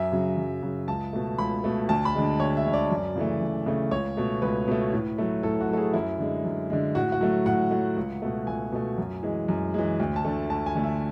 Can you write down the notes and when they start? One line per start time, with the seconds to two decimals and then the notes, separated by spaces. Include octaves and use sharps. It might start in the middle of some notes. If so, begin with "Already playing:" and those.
Already playing: F#2 E5
0.12 C#3 F#3
0.37 F#2
0.63 C#3 F#3
0.88 C#2 A5
1.13 B2 A3
1.38 C#2 B5
1.64 B2 A3
1.89 D2 A5
2.05 B5
2.14 D3 G#3
2.40 D2 C#5
2.57 E5
2.65 D3 G#3
2.73 D5
2.91 F#2
3.16 C#3 E3 A3
3.41 F#2
3.66 C#3 E3 A3
3.91 C#2 C#5
4.17 B2 A3
4.42 C#2 B4
4.68 B2 A3
4.93 A2
5.18 F#3 A3
5.43 A2 A4
5.60 F#4
5.69 F#3 A3 A4
5.77 G#4
5.94 F#2 E4
6.19 D3 G#3
6.44 F#2
6.70 D3 G#3
6.95 A2 F#4
7.12 F#4
7.21 F#3 A3
7.46 A2 F#5
7.71 F#3 A3
7.96 C#2
8.22 B2 A3
8.47 C#2 G#5
8.72 B2 A3
8.98 F#2
9.23 E3 G#3
9.48 F#2
9.74 E3 G#3
10.00 D2
10.16 A5
10.25 D3 A3
10.50 D2 A5
10.66 G#5
10.75 D3 A3
10.84 E5